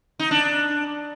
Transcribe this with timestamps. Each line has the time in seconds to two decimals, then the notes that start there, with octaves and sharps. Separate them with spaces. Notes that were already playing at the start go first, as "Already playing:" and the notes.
0.19 D#4
0.31 D4